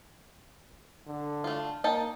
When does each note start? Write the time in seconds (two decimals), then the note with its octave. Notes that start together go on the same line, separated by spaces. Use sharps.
1.07 D3
1.44 A3 F4
1.84 A#3 D#4 G5 A5